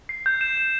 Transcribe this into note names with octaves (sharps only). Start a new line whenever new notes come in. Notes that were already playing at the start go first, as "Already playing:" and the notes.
C7
G6
E7
G6